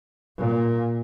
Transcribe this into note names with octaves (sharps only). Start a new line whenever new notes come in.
A#2